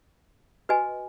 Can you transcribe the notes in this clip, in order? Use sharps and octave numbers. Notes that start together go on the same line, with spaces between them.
F#4 B4 D#5 G#5